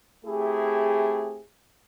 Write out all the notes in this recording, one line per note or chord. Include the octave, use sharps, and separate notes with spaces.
A3 C4 E4 G4 G#4